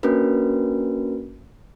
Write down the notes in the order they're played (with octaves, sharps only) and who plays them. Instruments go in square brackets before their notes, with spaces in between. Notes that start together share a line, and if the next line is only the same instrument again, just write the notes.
[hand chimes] A#3 C#4 D4 F#4 A#4 B4